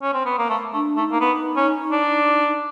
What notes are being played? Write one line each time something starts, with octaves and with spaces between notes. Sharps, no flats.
C#4
C4
B3
A#3
A3
A3 D4
A3 D#4
A#3
B3
C#4
D4